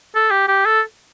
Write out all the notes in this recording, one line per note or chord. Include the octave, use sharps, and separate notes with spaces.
A4
G4
G4
A4